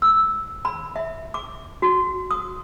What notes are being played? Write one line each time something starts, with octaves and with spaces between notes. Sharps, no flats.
E6
B5
E5
D6
F#4
D#6